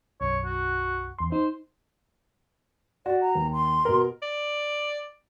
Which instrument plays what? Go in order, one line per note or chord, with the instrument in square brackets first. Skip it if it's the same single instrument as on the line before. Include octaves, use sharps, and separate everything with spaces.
[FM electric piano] B1 F#2 [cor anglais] C#5
[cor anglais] F#4
[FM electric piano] E2 C6
[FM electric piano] D#4 [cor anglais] C5
[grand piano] F#4 [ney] D5
[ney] A#5
[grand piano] D#2
[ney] C6
[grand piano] B2 A#4
[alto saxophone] D5